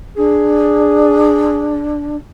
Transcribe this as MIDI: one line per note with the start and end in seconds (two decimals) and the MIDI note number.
0.17 2.16 62
0.17 1.87 68